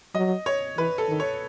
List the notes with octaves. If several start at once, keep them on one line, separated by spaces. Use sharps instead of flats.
F#3 D#5
C#5
E3 B4
A4
D#3
C#5